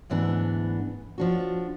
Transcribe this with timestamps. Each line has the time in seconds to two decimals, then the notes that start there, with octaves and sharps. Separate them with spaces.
0.10 D2 G#2 E3 B3 D4
1.18 F3 D4 F#4